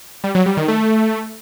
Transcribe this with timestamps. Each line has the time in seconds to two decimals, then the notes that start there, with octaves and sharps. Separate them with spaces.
0.24 G3
0.35 F#3
0.46 G3
0.57 D#3
0.68 A3